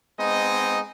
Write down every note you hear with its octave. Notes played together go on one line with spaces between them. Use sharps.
G#3 B3 C4 D#4 D#5